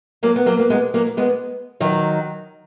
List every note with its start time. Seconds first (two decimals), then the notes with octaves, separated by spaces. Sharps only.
0.23 F#3 A#3
0.36 B3
0.46 F#3 A#3
0.59 A#3
0.70 G#3 B3
0.94 F#3 A#3
1.17 G#3 B3
1.80 D#3 F#3